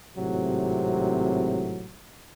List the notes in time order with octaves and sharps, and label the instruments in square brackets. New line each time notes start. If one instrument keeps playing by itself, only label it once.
[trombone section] G#1 A2 C3 F#3